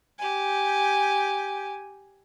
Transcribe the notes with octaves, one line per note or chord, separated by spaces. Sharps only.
G4 G#5